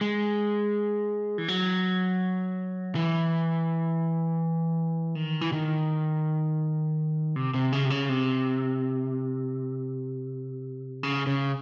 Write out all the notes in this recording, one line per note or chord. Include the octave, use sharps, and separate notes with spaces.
G#3
E3
F#3
E3
D#3
E3
D#3
C3
C3
C#3
C3
C#3
C3
C#3
C#3